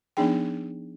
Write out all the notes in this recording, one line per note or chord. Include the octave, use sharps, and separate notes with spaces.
F3 B3 D4 D#4 G#4 G5